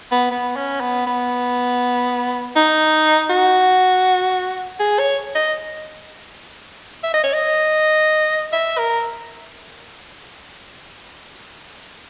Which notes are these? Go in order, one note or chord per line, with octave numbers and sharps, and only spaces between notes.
B3
B3
C#4
B3
B3
D#4
F#4
G#4
C#5
D#5
E5
D#5
C#5
D#5
E5
A#4